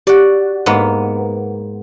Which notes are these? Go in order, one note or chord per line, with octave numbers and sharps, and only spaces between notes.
F#4 G4 D5
G#2 A#3 B3